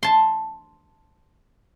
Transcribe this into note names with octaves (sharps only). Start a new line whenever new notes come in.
A5 C6